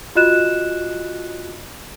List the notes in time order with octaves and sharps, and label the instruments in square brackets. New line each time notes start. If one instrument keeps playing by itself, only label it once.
[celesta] F4 F#4 D#5 F#6 E7